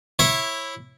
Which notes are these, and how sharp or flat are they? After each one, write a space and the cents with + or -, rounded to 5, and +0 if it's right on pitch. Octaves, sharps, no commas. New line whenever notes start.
E4 +0 C#5 -25